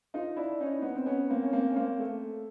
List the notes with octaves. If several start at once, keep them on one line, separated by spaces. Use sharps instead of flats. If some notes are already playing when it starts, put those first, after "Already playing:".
D#4 F4
D4 E4
C#4 D#4
B3
C4
B3 C#4
A#3 C4
C#4
A#3 C4
C#4
A#3 C4
A3